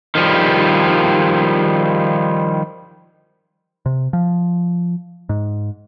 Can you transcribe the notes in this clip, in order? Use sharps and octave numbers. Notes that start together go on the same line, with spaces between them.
D#3 F3 G3
C3
F3
G#2